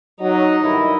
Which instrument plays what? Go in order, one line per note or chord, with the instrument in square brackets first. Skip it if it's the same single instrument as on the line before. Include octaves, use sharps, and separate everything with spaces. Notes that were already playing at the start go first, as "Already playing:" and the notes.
[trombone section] F#3 [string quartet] D#4
[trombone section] G2 D#3 E4